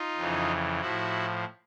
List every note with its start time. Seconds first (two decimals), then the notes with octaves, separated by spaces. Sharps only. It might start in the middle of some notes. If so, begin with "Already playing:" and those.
Already playing: D#4 F4
0.16 F2 C#3 E3
0.80 A2 F3 E4 F#4